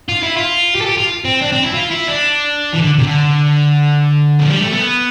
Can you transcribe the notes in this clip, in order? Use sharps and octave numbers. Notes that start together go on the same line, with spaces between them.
F4
E4
F4
G4
A4
G4
F4
C4
D4
C4
E4
F4
E4
D4
E3
D3
C3
D3
F3
G3
A3
B3